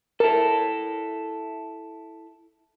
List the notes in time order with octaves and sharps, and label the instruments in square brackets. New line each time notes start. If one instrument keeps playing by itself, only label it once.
[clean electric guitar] E4 A4 [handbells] A#4